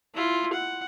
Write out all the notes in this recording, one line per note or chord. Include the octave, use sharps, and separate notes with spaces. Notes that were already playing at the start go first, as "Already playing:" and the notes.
E4 F4
F#5